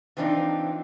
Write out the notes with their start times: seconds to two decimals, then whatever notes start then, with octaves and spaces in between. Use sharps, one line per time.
0.17 E3 F3 C4 D4 D#4